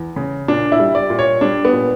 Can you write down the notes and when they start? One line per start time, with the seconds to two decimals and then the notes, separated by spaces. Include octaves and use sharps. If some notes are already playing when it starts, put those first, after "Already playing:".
Already playing: E2
0.16 C#3
0.48 A#2 D4
0.72 E4
0.79 G3
0.95 D5
1.10 A#2
1.19 C#5
1.41 G3 D4
1.65 B3
1.73 A#2